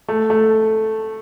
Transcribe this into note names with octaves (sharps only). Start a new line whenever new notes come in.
A3
A3